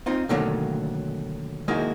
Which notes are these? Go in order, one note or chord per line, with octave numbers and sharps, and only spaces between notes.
C4 D#4 F4
B2 D3 D#3 F#3 A3 A#3
D#3 G#3 A#3 D#4 E4 F#4